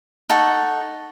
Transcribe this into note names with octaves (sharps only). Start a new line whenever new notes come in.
D#4 A4 F#5 C#6